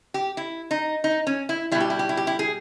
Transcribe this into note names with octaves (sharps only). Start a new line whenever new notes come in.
G4
E4
D#4
D#4
C#4
E4
B2 G3 E4
G4
E4
G4
E4
G4
E4
G#4